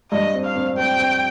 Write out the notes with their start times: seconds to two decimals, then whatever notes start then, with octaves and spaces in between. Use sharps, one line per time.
0.11 G2 D#5
0.34 C4
0.44 F5
0.55 C4
0.77 C4 G5
0.99 C4